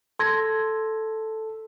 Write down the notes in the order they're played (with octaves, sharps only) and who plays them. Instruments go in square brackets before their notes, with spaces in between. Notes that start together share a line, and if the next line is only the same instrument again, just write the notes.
[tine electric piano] A4 [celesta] C6 G#6 A#6